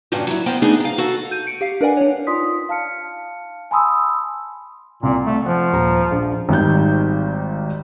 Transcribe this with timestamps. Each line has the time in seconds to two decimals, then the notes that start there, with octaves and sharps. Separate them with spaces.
0.12 G2 A#2 C#3 F#4
0.27 F#3 E4
0.46 B3 A#4 C5 G5
0.62 A3 B3 D4 D#4 G#4
0.80 F5 A#5
0.98 F#4 A4
1.31 G6 D#7
1.47 C#7 D7
1.61 G4 F5 C7
1.81 D4 A#4 B4 D5 F#5 G#5
1.97 D4 C#5
2.27 D#4 F4 D5 C6 D#6 B6
2.69 F5 A5 F6 C#7
3.71 G#5 A5 B5 C6 D#6 E6
5.03 C2 A#2
5.25 A3
5.46 F3 F#5
5.72 D#1 A#5
6.11 A#1
6.49 G#1 D#3 G3 G6